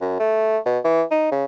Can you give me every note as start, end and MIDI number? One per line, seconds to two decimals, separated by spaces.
0.01 0.19 42
0.19 0.58 57
0.66 0.78 47
0.84 1.03 52
1.11 1.31 63
1.31 1.45 49